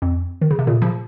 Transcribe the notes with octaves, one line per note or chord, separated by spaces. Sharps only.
F2
D#3
C#3
C3
A#2 C#3
C#3 F3